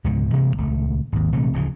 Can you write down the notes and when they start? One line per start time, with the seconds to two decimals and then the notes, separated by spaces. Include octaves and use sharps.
0.04 C#2 G#2 B2 D3
0.33 B2 E3 G#3 A#3
0.58 D#1 C#2 A3
1.12 G#1 D#2
1.32 A#1 C3 E3 A3
1.53 D1 D2 C#3 F3